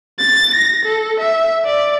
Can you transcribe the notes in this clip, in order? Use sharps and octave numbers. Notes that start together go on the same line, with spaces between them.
A6
A#6
A4
E5
D5